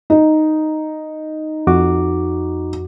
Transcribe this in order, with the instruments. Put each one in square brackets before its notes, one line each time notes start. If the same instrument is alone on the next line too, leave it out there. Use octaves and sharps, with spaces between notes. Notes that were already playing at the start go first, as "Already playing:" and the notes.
[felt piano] D#4
[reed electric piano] F2 F#4 D6